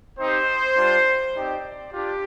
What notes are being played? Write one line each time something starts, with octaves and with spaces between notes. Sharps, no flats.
C4 D#4 G4 C5
G3 D4 F4
C4 D#4 G4 D5
D4 F4 G4